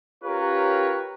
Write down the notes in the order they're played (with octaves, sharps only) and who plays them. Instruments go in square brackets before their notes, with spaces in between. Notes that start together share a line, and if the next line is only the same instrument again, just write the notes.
[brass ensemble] C#4 F4 G4 A#4 B4 C#5